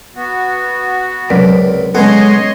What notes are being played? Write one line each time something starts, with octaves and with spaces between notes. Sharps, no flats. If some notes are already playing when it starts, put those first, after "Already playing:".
B3 F#4
C#2 C3 F#3 C4 A#4 B4 D5
C#3 G#3 B3 A4 C#5 D#5 C6